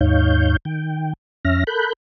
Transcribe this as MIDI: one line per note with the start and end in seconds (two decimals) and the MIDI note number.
0.01 0.57 39
0.01 0.57 44
0.01 0.57 63
0.01 0.57 73
0.01 0.57 77
0.01 0.57 91
0.65 1.13 51
0.65 1.13 79
1.45 1.64 41
1.45 1.64 61
1.45 1.64 76
1.45 1.64 89
1.45 1.64 94
1.67 1.93 69
1.67 1.93 70
1.67 1.93 83
1.67 1.93 90
1.67 1.93 91